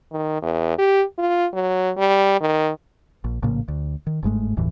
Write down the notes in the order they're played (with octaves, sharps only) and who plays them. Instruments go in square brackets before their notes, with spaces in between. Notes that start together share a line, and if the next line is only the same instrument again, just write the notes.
[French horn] D#3
E2
G4
F4
F#3
G3
D#3
[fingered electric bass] A#1
A#1 A2 C#3 A#3
D2
D#3
G1 G#2 G#3 A3
F#1 D#2 A2 E3